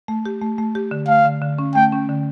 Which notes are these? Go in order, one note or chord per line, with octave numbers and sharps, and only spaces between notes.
A3
G4
A3
A3
G4
D3
A3 F5
D3
D3
C#4
A3 G5
C#4
D3